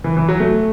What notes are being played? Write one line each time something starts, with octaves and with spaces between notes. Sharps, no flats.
E3
E3
F#3
A3